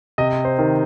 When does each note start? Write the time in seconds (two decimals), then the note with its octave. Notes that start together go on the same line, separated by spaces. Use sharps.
0.18 C3 D#5
0.45 C5
0.58 D#3